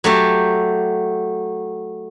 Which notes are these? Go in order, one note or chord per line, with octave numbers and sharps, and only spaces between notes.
F#3 A3 G4